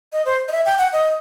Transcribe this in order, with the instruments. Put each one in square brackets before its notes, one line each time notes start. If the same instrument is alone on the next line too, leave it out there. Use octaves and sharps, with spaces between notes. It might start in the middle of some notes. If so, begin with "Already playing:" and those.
[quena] D#5
C5
D#5
E5
G5
F#5
D#5